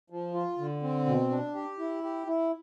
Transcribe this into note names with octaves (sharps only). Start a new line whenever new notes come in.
F3
F4
D3
C4
B2
D4
G4
E4
G4
E4